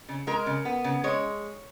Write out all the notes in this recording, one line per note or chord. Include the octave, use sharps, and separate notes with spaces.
C#3
G#3 A#4
C#3
B3
C#3
G#3 C#5